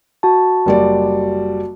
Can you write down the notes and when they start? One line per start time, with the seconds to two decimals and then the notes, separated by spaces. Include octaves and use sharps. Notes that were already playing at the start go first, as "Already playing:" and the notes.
0.23 F#4 A5
0.66 F#1 G3 D5